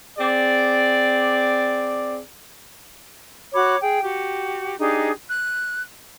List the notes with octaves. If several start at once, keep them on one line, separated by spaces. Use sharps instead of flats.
C4 G#4 D5
F#4 C#5 B5 D6
G#4 G5
F#4 G4
D4 D#4 G4 G#4
F#6